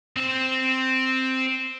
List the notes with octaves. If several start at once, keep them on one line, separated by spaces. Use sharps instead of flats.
C4 C5